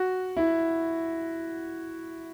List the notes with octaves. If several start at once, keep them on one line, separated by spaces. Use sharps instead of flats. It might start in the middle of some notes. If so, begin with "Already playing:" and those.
Already playing: F#4
E4